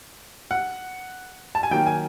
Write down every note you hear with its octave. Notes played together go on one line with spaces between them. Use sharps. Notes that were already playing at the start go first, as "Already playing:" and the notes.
F#5
A5
G#5
D#3 F#3 A#3 G5
G#5